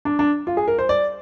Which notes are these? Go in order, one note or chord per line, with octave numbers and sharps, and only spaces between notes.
D4
D4
F4
G#4
A#4
C5
D5